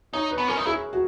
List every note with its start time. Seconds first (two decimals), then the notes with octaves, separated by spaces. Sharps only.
0.13 D#4 C#5
0.31 B4
0.38 B3
0.48 C#4 A#4
0.57 D#4
0.66 E4 G#4
0.93 F#4